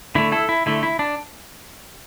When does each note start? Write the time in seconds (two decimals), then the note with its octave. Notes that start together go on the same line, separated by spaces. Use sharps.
0.15 D3 A3 E4
0.32 E4 A4
0.49 E4
0.66 D3 A3 E4
0.83 E4
0.99 D4